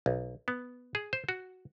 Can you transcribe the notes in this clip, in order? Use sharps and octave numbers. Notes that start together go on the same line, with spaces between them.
B1
B3
G#4
C5
F#4